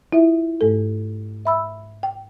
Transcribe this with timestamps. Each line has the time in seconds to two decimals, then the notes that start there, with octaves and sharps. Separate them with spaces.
0.13 E4 F4 E5
0.61 G#2 A3 A4
1.45 E5 B5 E6
2.03 G5